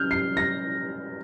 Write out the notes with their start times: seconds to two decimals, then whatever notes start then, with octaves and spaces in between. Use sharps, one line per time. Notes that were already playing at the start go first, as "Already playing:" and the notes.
Already playing: C#4 F6 G6
0.11 C7
0.37 A#6